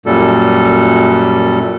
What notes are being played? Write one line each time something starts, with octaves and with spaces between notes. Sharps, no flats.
F#2 A#2 G3 A4